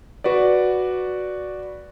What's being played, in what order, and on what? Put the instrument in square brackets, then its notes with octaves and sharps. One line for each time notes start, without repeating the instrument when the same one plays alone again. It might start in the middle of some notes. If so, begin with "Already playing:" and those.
[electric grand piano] F#4 B4 D5